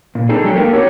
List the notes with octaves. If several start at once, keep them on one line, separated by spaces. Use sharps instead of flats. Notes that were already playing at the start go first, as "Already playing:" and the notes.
A#2
C4 D4 D#4 G#4 A4
F#3 G#3 D4 G4 A4
A#3 D4 G4 A4 A#4
C4 D#4 F#4 G4 C#5